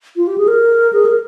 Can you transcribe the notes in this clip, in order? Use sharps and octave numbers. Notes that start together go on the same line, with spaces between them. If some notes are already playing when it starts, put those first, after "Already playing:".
F4
G4
G#4
A#4
G#4
A#4